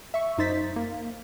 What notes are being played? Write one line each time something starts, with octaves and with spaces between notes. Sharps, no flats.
E5 C#6
F#2 D#4 C5 A6 B6
A#3